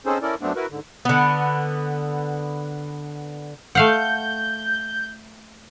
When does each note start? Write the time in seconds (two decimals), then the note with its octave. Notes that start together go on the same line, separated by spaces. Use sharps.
0.06 C4 C#4 D#4 G#4 A4 C5
0.22 C#4 E4 A4 A#4 D5
0.41 F#2 A3 B3 C4 D4
0.56 E4 F#4 A#4 B4
0.70 G#2 D3
1.05 D3 B3
3.75 A3 F5 F#5 G6